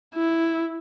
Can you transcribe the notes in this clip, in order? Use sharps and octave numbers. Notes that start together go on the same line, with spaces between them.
E4